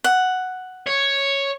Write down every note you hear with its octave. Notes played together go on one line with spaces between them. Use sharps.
F#5
C#5